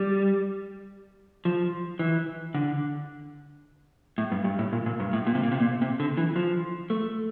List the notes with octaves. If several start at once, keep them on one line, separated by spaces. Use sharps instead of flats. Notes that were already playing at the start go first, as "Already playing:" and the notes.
Already playing: G3
F3
E3
D3
A2
G2
G2
A2
A#2
A#2
G2
A2
A#2
C3
A#2
C3
A#2
C3
D3
E3
F3
A3